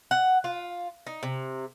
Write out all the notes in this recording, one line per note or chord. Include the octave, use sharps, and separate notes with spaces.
F#5
F4
D#4
C3